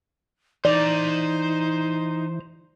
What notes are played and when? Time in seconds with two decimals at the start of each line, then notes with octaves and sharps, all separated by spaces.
0.65 E3 D#4 C5 D5 A#5